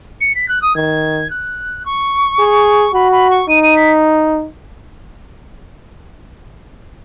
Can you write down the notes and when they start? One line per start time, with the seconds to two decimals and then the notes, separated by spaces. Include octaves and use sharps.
0.21 C#7
0.35 B6
0.48 F#6
0.62 D#6
0.75 D#3 G#6
1.30 F#6
1.85 C#6
2.39 G#4
2.93 F#4 B5
3.12 B5
3.30 C#6
3.48 D#4 D#7
3.63 D#7
3.76 B6